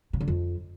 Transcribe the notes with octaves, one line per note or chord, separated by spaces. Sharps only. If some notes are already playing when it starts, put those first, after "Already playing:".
C#3
D3
F2